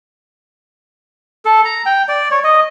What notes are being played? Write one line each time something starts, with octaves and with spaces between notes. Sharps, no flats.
A4
A#5
G5
D5
C#5
D#5